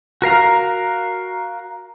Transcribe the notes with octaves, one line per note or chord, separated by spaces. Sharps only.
F#4 A#4 F5 A#5